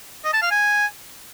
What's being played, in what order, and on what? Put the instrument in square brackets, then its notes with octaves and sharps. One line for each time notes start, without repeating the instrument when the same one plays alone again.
[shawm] D#5
A5
F5
G#5